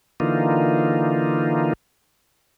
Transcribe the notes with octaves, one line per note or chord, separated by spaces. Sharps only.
D3 E3 A#3 D#4 F4